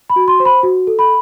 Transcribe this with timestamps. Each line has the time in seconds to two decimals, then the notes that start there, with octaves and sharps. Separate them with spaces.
0.10 B5
0.16 F#4
0.28 C6
0.40 C5
0.45 B5
0.63 F#4
0.87 A4
0.99 B5